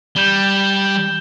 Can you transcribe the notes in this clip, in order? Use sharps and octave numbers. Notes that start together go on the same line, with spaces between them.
G3 G6 E7 G7